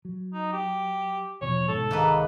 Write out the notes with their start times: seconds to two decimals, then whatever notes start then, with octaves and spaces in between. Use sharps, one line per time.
0.05 F#3
0.33 D#4
0.52 G4
1.41 E2 B2 F3 C#5
1.68 G1 G#2 B2 A4
1.91 C2 G#2 D#3 A#3 B4